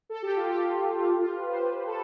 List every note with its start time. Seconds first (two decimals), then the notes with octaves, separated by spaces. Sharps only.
0.09 A4
0.22 G4
0.36 F4
0.49 G4
1.11 G4
1.19 F4
1.23 G4
1.36 B4
1.48 C5
1.61 B4
1.86 A4